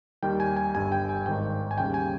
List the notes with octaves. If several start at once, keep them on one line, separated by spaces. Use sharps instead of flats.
D#2 D#3 G3 G5
G#5
G#5
G1 G2 G3 G#5
G5
G#5
G#1 G#2 D#3 G5
G#5
D#2 C#3 G3 G5
G#5